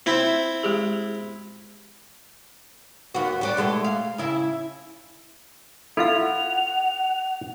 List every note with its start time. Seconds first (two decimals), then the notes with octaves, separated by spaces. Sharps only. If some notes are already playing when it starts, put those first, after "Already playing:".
0.06 C4 E4
0.63 G#3 G4 G#4
3.14 D#2 B3 F#4
3.41 G3 F#4 D5
3.57 B2 G#3 A3
3.84 F5
4.18 C#3 E4
5.97 E4 F4 A4 F5 F#5 F7